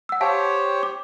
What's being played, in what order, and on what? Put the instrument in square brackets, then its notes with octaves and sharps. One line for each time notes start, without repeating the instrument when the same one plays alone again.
[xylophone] F#5 E6
[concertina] G4 C5 C#5 [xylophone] F5 F#5 A5
[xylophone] D6